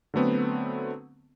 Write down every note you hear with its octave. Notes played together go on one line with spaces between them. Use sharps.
D3 F#3 A3 B3 C4